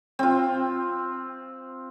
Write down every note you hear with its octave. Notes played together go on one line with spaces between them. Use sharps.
C4 F4